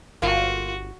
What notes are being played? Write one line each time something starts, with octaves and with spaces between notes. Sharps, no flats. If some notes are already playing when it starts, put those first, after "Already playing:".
G1 A#3 F4 F#4